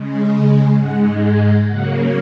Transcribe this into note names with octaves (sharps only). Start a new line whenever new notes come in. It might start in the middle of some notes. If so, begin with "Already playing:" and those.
Already playing: C#3 G#3
G#2 G#3 F#5
G#5
C#3 F#3 A#3 F#5